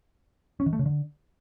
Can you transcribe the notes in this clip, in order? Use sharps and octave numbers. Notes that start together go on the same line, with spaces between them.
C#4
D#3
A3
C#3
D3